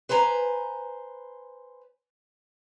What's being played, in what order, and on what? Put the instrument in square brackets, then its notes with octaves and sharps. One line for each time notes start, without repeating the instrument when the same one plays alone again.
[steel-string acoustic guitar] B4 C5 G#5 A#5